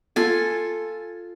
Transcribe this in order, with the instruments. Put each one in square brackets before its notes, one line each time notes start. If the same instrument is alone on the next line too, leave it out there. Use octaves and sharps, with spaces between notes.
[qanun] F4 A4 G#5